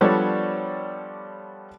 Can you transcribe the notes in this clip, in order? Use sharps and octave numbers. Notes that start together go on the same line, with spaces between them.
F3 G3 B3 D4 A4 C#5